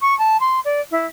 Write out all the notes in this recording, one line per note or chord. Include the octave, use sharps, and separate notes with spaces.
C#6
A5
C6
D5
E4